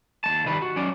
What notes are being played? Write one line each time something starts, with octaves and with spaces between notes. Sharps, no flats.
D#2 G#3 A5
D#3 G3 B4
F#4
F#3 C#4 D5